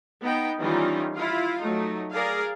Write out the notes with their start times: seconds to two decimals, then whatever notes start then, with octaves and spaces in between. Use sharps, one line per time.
0.22 B3 D#4 G5
0.60 D#3 E3 G3 C#4 D#4 F4
1.16 E4 F4 F5
1.60 F#3 A3 D#4
2.13 G#4 A#4 D5 F5